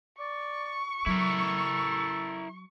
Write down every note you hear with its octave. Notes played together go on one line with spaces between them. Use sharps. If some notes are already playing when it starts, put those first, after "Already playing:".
D5 C#6
F#3 E4 A4 A#4